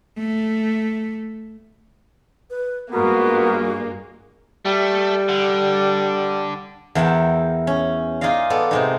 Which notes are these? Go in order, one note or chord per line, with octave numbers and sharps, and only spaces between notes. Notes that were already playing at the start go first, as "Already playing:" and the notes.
A3
B4
G2 G#3 A#3 B3 F4 F#4 A#4
G3 A3
D3
E2 E4 A#4 F#5 G5 A5
C#4
D#4 F4 G#4 D5 D#5 F5
B3 A4 D5
C3 G#3 D#4